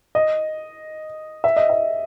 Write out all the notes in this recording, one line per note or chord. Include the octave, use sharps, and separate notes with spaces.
D#5
E5
D#5
E5